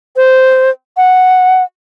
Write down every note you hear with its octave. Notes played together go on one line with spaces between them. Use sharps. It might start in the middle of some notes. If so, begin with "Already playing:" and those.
C5
F#5